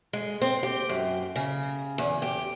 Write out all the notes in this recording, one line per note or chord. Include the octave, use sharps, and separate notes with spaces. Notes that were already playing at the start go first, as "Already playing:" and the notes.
G#3
C4
G4
F#2
C#3
E2
G4